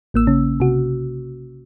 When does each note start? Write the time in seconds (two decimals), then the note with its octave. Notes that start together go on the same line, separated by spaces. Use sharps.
0.14 A1 A#3 E6
0.27 C#3 C#4
0.60 C3 F#4